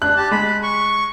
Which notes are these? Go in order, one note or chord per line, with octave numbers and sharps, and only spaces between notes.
D4 F#6
G4 A5
G#3 B5
C#6